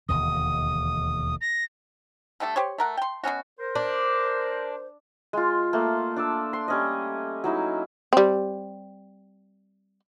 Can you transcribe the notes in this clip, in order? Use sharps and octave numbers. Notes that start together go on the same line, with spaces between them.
E1 D#2 D3 D#6
A#6
D3 G3 A3 A4
G4 C5 C#5
A3 A#4 F#5
G5 C6
B2 B3 C#4 F#4
A#4 C5
D4
G#3 F4
A3 A#3 A5 C6
D4 D5 E6
C6
G3 C#4 D#5
F#3 D#4 E4
G3 C4